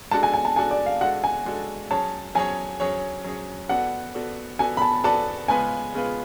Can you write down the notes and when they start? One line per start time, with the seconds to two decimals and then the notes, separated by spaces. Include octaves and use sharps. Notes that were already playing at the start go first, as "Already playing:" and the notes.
0.11 G#3 D4 F#4 A4 A5
0.23 G#5
0.34 G#5
0.45 A5
0.56 G#3 D4 F#4 A4 G#5
0.71 D5
0.86 F5
1.01 G#3 D4 F#4 A4 F#5
1.24 G#5
1.46 G#3 D4 F#4 A4
1.91 F#3 C#4 G#4 C#5 A5
2.35 F#3 C#4 G#4 C#5 G#5
2.80 F#3 C#4 G#4 C#5
3.24 F#3 C#4 G#4 C#5
3.69 B3 F#4 A4 D5 F#5
4.15 B3 F#4 A4 D5
4.59 B3 F#4 A4 D5 G#5
4.77 B5
4.82 A5
5.04 B3 F#4 A4 D5 A5
5.48 C#3 G#3 B3 F4 B4 G#5
5.94 C#3 G#3 B3 F4 B4